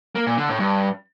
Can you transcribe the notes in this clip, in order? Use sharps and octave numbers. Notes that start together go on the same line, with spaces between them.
A#3
A#2
D3
A2
G2